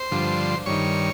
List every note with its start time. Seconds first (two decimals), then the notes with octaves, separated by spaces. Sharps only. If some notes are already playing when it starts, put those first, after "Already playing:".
Already playing: C5
0.11 G2 D3 F3
0.66 G2 D#3 C#5